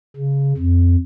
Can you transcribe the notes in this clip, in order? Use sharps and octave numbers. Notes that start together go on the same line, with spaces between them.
C#3
F2